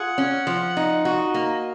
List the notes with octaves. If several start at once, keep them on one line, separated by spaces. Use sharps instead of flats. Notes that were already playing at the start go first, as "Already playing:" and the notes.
Already playing: F4 G#4 F#5
C#4
F3
D#4
F#4 D#5
A#3